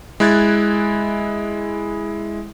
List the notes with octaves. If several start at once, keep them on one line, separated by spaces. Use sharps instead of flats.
G#3 E4 F#6 G#6 A6